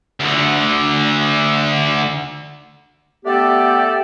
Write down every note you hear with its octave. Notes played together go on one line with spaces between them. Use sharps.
D2 D3
A3 B3 G4 A4 D5 G5